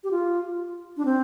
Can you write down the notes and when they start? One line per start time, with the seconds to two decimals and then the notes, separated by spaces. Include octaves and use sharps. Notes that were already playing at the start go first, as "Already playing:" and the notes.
0.04 G4
0.11 F4
0.97 D4
1.05 C4